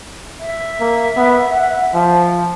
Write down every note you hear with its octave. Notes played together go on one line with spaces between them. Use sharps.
E5
A#3
B3
F#5
F3